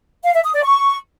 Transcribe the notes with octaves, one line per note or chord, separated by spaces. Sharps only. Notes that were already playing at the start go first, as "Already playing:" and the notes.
F5
E5
D#6
D5
C#6